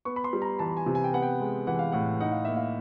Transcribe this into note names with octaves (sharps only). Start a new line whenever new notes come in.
B3 C#6
B5
C6
G3
A#5
E3 A5
G#5
C3
G#5
G5
B3 F#5
G5
G#3
E3 F#5
F5
A2 F#5
D#4 F#5
F5
A#3 E5
F5